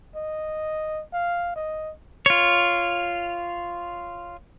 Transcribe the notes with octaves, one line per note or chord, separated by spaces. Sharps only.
D#5
F5
D#5
F4 C#5